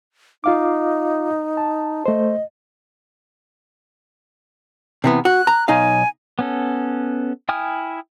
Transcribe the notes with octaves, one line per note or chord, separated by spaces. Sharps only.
D#4 F4 F5 D6
A5
A3 C5 D#5
C3 E3 B3
F#4 F#6
A#5
B1 D#4 F5 G#5
B3 C#4 A4
E4 G5 G#5 D#6 F6